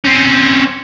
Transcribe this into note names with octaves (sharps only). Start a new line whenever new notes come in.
C4 C#4